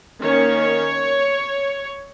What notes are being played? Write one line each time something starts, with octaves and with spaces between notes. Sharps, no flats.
D#3 A#3 C#4 C#5